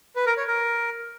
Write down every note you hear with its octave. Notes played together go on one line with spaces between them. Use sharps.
B4
A#4
C#5
A#4